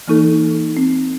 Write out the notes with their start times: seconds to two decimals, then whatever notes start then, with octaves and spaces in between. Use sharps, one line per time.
0.08 E3 A#3 D#4 A4
0.77 C4